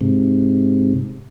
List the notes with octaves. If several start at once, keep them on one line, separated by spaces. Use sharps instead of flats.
G#2 C3